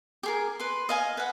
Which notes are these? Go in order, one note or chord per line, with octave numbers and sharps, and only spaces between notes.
G4 G#4 A#4
B4 C6
D#5 F5 G#5
B4 F#5